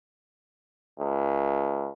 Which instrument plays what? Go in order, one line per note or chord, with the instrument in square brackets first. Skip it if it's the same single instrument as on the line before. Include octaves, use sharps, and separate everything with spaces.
[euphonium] C#2